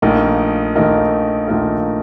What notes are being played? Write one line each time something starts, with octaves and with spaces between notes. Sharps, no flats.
A#1 A#2 A3 D#4 A#4
A#1 A#2 A3 D#4 A#4
A#1 A#2 A3 D#4 A#4